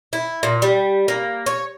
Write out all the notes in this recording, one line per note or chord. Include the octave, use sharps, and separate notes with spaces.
E4
A#2
G3
A#3
C#5